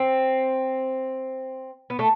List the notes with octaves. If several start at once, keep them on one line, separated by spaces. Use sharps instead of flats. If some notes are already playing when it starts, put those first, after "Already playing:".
Already playing: C4
B3
A3